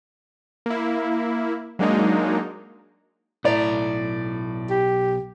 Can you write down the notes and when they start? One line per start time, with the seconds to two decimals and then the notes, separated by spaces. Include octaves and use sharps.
0.66 A#3 E4
1.79 F#3 G#3 A#3 D4 D#4
3.44 B1 A2 D5 A#5
4.70 G4